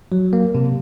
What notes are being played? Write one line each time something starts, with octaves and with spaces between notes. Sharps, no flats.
F#3
A#3
C3